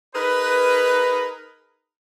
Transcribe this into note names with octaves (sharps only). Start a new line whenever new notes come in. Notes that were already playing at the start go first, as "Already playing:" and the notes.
D#4 G#4 A#4 B4